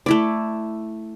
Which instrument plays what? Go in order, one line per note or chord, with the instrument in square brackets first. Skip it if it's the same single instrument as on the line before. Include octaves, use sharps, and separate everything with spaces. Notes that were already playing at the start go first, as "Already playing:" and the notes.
[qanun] A3 E4 D5